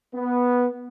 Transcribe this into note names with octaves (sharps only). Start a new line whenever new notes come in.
B3